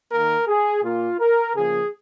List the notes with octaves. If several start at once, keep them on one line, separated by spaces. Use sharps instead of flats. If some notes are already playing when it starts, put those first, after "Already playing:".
D#3 A#3 A#4
G#4
A#2 A#3 F4
A#4
C#3 F3 A#3 G#4